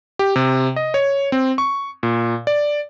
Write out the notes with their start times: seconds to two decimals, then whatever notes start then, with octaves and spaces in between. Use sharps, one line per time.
0.19 G4
0.36 C3
0.76 D#5
0.94 C#5
1.32 C4
1.58 C#6
2.03 A#2
2.47 D5